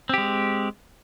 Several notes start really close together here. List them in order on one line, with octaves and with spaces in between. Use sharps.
C4 G4 G#3